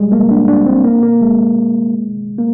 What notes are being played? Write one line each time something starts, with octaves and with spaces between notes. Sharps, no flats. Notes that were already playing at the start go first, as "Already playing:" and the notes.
Already playing: G3 G#3
A#3
D4
D4
C4
A#3
A#3
G#3
A#3